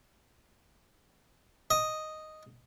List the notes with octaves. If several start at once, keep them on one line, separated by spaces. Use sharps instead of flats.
D#5